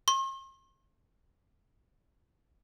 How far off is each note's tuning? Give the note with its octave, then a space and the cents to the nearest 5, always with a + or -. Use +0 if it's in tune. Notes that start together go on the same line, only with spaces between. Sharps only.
C6 +45